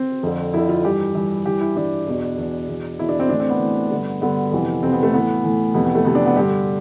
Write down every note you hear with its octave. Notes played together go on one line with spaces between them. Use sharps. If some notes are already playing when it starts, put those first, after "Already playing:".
Already playing: C4
F2 D3
F2 D3 E4
F4
G2 E3 G4
G2 E3
G2 E3 G4
E4
G2 E3 D4
E2 B2
E2 B2
E2 B2
E2 B2 E4
D4
C4
A2 E3 D4
C4
B3
A2 E3
G2 D3
G2 D3 B3
F2 C3 E3
F2 C3 E3 C4
B3
A3
A2 E3 B3
A2 E3
F2 C3 E3 B3
B3
A3
F2 C3 E3 B3
D4
B3
G2 D3 G4